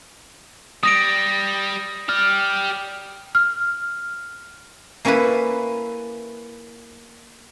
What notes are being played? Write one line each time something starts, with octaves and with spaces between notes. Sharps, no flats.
G3 D#6 A#6 D7
G4 D5 F6
F6
A#3 C#4 E4 A4 B4